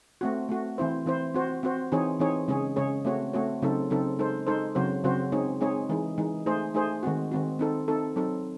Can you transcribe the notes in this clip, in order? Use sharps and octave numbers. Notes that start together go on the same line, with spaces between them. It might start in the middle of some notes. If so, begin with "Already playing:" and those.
A3 C4 F#4
A3 C4 F#4
E3 C4 E4 C5
E3 C4 E4 C5
C4 F#4 C5
C4 F#4 C5
E3 C4 D#4 G#4 C#5
E3 C4 D#4 G#4 C#5
C#3 G#3 C#4 G#4 C#5
C#3 G#3 C#4 G#4 C#5
A3 C4 F#4 C#5
A3 C4 F#4 C#5
C#3 F#3 C4 D#4 A4
C#3 F#3 C4 D#4 A4
G#3 D#4 A4 C5
G#3 D#4 A4 C5
C#3 F#3 C4 F#4 C5
C#3 F#3 C4 F#4 C5
G#3 C4 D#4 G#4 C#5
G#3 C4 D#4 G#4 C#5
E3 G#3 D#4
E3 G#3 D#4
A3 D#4 G#4 C5
A3 D#4 G#4 C5
D#3 G#3 C4 F#4
D#3 G#3 C4 F#4
C4 D#4 A4
C4 D#4 A4
F#3 C4 D#4 A4